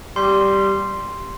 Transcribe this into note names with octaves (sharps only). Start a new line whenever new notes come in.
G3 C6